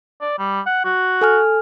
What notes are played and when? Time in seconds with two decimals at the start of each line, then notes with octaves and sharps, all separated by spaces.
0.21 D5
0.38 G3
0.66 F#5
0.84 F#4
1.21 A4 G#5 F6